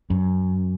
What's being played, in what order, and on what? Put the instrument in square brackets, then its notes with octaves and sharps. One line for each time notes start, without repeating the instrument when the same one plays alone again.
[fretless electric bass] F#2